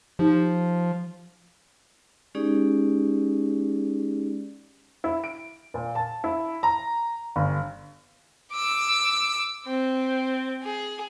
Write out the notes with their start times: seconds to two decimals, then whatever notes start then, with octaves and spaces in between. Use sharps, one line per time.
0.19 F3 D#4 G4
2.35 G#3 C#4 D#4 G4 G#4 D5
5.04 E4
5.24 D7
5.74 A#2
5.95 A5
6.24 E4
6.63 A#5
7.36 G1
8.52 D6 E6
9.66 C4
10.63 G#4